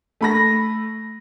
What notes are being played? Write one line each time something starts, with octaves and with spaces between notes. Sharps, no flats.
A3 B5 A#6